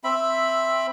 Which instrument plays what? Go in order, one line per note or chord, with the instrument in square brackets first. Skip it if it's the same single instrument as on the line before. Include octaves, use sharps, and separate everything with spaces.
[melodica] C4 E5 B5